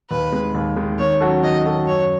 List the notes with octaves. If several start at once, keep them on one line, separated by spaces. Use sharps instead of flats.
D#2 B4
D#3 G#3
D#2
D#3 G#3
D#3 C#5
F#3 C#4 F#4 A4
D#3 D#5
F#3 C#4 F#4 A4
F#2 C#5